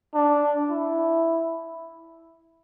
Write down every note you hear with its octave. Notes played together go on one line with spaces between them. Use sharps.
D4
E4